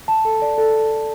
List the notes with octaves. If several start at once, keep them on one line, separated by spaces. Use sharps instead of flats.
A5
A4
D5
A4
A4
A4